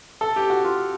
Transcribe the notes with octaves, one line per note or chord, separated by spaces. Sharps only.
A4
G4
F#4
F4